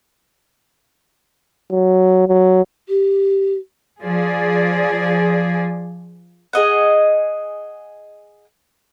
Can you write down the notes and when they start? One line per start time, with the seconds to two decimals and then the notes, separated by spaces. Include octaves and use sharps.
1.72 F#3
2.28 F#3
2.89 G4
4.03 F3 G#4 D5
6.53 G#4 D#5 F#5